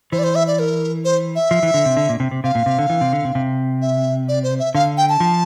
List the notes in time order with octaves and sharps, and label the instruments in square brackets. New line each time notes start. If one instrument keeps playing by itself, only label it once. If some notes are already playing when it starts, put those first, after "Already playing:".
[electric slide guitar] E3 [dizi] C5
[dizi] D5
C5
E5
D5
A#4
C5
E5
[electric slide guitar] F3
E3
D3
C3
D3
A#2
C3
C3
[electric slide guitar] C3 [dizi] F5
[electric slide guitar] A#2
C3
D3
E3
C3
D3
C3
C3
[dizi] E5
D5
C5
E5
[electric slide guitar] D3 [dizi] F5
[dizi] G5
A5
[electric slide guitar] F3